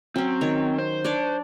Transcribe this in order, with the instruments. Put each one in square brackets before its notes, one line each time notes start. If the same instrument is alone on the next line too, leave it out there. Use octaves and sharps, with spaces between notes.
[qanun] F#3 C#4 [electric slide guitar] C4
[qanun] D#3 C#5
[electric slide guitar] C5
[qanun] D4 C#5 D5